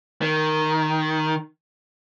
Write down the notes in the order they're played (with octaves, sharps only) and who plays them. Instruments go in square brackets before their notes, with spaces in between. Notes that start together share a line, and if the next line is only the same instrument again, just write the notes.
[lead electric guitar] D#3